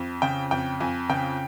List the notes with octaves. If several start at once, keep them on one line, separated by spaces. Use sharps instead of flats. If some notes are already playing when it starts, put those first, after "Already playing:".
Already playing: F2
C#3 G5
F2 G5
F2 G#5
C#3 G5